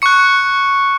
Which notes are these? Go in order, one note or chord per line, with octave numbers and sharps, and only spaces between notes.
C#6 F#6 C#7